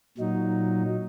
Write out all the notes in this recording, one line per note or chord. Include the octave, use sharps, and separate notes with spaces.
A#2 F#3 D#4